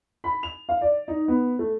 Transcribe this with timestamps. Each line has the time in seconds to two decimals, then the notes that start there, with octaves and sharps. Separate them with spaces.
0.24 B5
0.43 F7
0.69 F5
0.81 D5
1.08 D#4
1.28 B3
1.59 A3